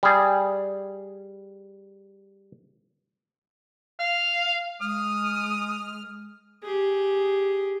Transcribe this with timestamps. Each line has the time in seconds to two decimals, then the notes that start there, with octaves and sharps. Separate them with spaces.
0.03 G3 G#4
3.99 F5
4.81 G#3 D#6 F6
6.63 G4 G#4